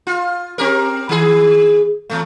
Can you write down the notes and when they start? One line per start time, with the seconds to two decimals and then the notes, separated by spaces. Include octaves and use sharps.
0.07 F4
0.58 C4 G4 A#4
1.09 D#3 G#4
2.10 E2 A2 A3